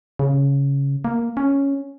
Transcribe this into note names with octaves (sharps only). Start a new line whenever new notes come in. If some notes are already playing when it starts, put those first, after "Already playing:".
C#3
A#3
C#4